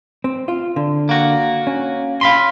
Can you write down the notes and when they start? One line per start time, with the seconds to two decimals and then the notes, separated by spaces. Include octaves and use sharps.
0.24 C4
0.48 F4
0.76 D3
1.09 A#3 F#4
1.67 C#4
2.21 F5 B5 C6